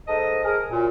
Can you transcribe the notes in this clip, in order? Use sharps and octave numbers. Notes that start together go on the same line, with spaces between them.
G#2 A4 D#5
G#4 A#4
F#2 A#2